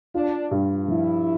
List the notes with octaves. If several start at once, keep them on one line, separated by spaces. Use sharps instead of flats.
D4 F4
G2
F3 E4